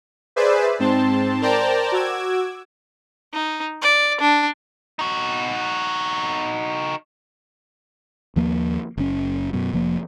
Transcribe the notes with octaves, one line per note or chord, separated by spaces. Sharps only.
G#4 B4 C5 D5 E5
G#2 C4 A5 C6
A#4 C5 D5 G5 A5 A#5
F#4 D6 E6 G#6
D#4
D5
D4
D#4 F#4
D#2 F3 A#3
F#1 C#4
F#2 B2
F1 F3 A#3